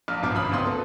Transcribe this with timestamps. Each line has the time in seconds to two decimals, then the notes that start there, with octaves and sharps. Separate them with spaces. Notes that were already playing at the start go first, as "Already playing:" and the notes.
0.08 A#1 A#2 A#3 A#4 F6
0.23 E1 B1 G#2 B2 F3 D6
0.35 G1 C#3 B5 D#6 F6
0.51 G#1 C#2 B3 C4 C6 D#6
0.63 B2 A#3 A4 B4